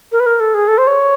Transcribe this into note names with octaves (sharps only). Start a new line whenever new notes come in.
A#4
B4
A#4
A4
G#4
A4
C5
C#5